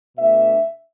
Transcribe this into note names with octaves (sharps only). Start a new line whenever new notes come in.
B2 A3 D4 E5